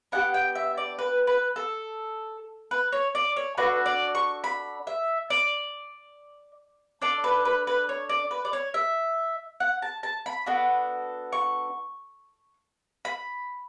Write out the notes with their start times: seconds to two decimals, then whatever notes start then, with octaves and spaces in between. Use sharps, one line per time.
0.12 B3 D4 G4 F#5
0.34 G5
0.56 E5
0.77 D5
0.99 B4
1.27 B4
1.56 A4
2.71 B4
2.93 C#5
3.15 D5
3.36 C#5
3.57 D4 F#4 A4 B4
3.86 D5
4.15 C#6
4.44 B5
4.87 E5
5.30 D5
7.02 D4 A4 D5
7.24 B4
7.45 B4
7.67 B4
7.89 C#5
8.09 D5
8.31 B4
8.45 D5
8.53 C#5
8.74 E5
9.60 F#5
9.82 A5
10.03 A5
10.26 B5
10.46 B3 D4 F#4 A4
11.33 C#6
13.05 B5